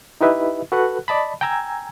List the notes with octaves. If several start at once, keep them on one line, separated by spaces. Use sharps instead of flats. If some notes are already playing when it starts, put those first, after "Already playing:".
D#4 E4 G4 B4 D#5 E5
F#4 A4 B4 F#5 F#6
D5 D#5 A5 B5
G5 G#5 A#5 E6 G#6